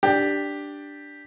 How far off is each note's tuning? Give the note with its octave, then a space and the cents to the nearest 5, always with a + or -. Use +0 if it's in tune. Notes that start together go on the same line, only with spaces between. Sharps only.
D4 +0 G4 +0